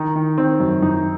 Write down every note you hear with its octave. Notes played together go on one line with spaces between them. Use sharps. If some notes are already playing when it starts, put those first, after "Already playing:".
Already playing: D#3 D#4
D#3
D#3 C4
F#2
F#2 D#4